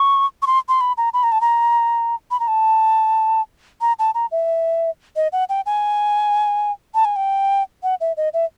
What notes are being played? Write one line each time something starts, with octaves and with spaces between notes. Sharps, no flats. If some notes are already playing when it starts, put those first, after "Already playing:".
Already playing: C#6
C#6
C6
C6
B5
A#5
B5
A#5
A5
A#5
B5
A#5
A5
A#5
A5
A#5
E5
D#5
F#5
G5
G#5
A5
G#5
G5
F#5
E5
D#5
E5